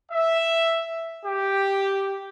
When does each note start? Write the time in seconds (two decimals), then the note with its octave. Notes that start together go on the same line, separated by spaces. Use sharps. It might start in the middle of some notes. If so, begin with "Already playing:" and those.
0.12 E5
1.26 G4